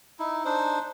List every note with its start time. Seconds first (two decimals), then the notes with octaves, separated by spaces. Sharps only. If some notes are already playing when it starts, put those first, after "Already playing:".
0.19 D#4 E4
0.45 D4 D#4 C5